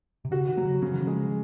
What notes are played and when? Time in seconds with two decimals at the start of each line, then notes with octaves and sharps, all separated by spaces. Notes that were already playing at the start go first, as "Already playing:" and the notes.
0.25 C3
0.31 C#3 F#4
0.48 D#3
0.57 F#3
0.65 C#3
0.82 C#3 F3
0.92 D#3
1.01 F3
1.07 G#3